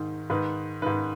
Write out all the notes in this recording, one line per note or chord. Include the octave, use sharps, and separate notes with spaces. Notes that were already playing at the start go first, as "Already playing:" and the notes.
Already playing: G#2 D#3
G#2 D#3 B4
G#2 D#3 B4